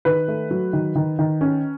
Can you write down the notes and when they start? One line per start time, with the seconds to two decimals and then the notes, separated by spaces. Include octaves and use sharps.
0.05 D#3 B4
0.28 A3
0.51 F#3
0.73 D#3
0.95 D#3
1.19 D#3
1.41 C#4